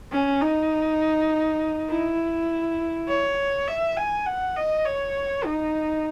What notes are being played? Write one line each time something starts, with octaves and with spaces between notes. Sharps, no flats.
C#4
D#4
E4
C#5
E5
G#5
F#5
D#5
C#5
D#4